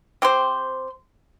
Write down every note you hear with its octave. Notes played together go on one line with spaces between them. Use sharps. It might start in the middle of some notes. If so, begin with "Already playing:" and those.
C4 G4 C5